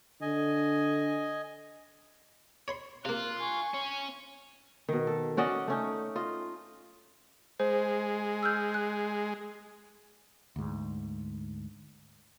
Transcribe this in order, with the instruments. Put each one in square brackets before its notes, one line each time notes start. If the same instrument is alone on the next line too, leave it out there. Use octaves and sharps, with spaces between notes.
[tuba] D3 [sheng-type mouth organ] D#5 G#5
[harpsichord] C#5 B5 C6
[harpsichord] C3 A#3 [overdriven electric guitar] F4 [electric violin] F#6
[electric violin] G#5 C#6
[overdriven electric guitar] C#4
[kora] B2 D#3
A4
C#4 F#4 D5 D#5
A3 C#4 D#4
F4 D#5
[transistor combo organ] G#3 [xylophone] C5
[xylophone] E6 F6 G6
F#6
[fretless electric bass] D2 G#2